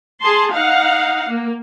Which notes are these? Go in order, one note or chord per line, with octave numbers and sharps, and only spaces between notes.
G#4 A5 C6
D#4 F5 F#5
A#3